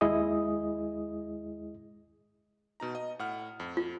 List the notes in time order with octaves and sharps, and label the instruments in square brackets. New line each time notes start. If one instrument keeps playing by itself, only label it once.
[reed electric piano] D#2 G#3 E4 G#4 D#5 D#6
[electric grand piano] B2 D#4 A#5
D#5
A2 F#5 F6
F2
[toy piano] F4